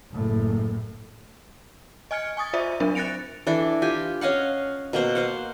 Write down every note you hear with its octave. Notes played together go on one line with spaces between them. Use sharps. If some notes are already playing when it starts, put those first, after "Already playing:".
F#1 A2
D#5 G#5 F6 G#6 C#7
G#5 C#6 D#6 A6
F4 C5 D5 E5
F#3 C4 D4 A#4 E5
F#6 A6 A#6 C#7 D7 F7
E3 D4 A4
F4 G4 G#5
C#4 D#5 F5 F#5
B2 A#3 C5
C5 F5 F#5